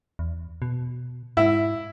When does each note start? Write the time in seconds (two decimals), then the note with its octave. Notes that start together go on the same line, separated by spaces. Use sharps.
0.19 E2
0.62 B2
1.37 G#2 E4